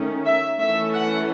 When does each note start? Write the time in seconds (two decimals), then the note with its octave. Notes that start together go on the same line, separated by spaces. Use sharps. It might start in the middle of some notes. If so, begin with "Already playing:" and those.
Already playing: D#3 A3 C#4
0.25 E5
0.59 E3 A3 C#4 E5
0.93 F#5